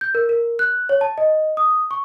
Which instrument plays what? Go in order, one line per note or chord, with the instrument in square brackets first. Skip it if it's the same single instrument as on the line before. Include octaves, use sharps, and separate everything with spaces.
[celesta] G6
A#4
A#4
F#6
C#5
A5
D#5
D#6
C#6